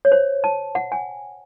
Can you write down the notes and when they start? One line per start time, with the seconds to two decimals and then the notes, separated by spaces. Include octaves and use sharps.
0.05 C#5
0.12 C5
0.44 A5
0.75 F#5
0.92 G#5